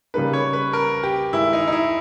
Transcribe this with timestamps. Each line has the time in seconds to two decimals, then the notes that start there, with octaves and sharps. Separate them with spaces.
0.14 C#3 G3 A#3 D#4 B4
0.33 C#5
0.53 B4
0.73 A#4
1.03 G4
1.32 G2 D#3 G#3 E4
1.53 D#4
1.67 D#4
1.72 E4